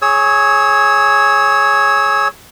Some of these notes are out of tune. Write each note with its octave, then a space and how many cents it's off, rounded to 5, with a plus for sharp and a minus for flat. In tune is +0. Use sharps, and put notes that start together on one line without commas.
G#4 +0 C#5 +0 E6 -30